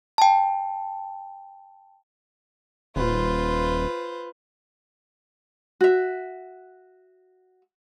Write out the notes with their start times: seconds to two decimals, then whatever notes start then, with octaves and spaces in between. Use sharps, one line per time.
0.18 G5 A5
2.96 D#1 F4 B4 C5
5.81 F#4 E5